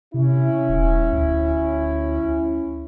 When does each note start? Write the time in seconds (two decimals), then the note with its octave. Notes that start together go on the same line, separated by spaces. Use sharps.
0.14 C3 C#4 E4
0.69 D#1
1.12 D2